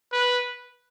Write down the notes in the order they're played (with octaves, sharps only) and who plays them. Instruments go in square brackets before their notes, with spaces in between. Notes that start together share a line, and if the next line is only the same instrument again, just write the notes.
[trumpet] B4